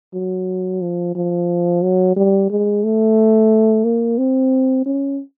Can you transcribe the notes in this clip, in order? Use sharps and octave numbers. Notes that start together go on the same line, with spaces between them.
F#3
F3
F3
F#3
G3
G#3
A3
A#3
C4
C#4